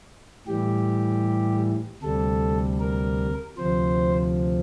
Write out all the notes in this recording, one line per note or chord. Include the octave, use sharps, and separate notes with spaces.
A2 E3 G3 G4
D2 C3 G3 A4
A#4
D2 C3 F3 C5